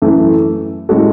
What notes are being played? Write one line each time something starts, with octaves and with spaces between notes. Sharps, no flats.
F#2 E3 A3
A2 G#3 C#4 F#4 A4